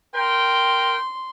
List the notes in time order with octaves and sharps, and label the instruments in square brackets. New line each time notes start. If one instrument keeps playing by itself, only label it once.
[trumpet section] A#4 G5 [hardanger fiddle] C6